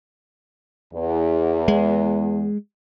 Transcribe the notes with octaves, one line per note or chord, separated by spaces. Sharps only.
E2
G#3